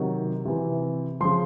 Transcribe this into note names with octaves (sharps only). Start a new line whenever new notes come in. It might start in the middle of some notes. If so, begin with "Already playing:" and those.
Already playing: C3 D#3 F#3
C3 E3
C#3 F3 C6